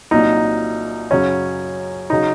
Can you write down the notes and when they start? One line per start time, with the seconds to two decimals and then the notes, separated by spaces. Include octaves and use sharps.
0.11 C2 A#2 F#3 D#4
1.11 F#2 C#3 F#3 C#4
2.10 C#3 F#3 D#4